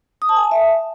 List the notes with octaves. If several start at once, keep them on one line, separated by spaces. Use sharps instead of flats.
D#6
A5
G#5
A5
E5